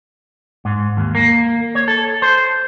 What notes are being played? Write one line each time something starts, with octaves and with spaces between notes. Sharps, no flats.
G#2
D#2
A#3
C#5
A4
C5